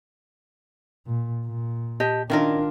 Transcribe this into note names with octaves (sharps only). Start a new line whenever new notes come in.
A#2
A#2
G4 D#5 A5
D#3 C#4 D4 E4 F4 A#4 D#5